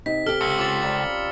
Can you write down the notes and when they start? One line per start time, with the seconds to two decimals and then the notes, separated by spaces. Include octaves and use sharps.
0.06 C3 D#4 B6
0.26 G4 A4 F6 G7
0.41 C#2 E6 C#7
0.59 C#4 F4 D6 A6
0.82 F3 G3 A#4 A6